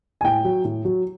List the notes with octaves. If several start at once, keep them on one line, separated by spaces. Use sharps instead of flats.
G#5
A2 G5
F#3
A2
F#3